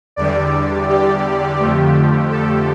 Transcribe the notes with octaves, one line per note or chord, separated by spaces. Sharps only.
E2 D3 G3 D5
G4
F2 D3 F3 A3 G4
A4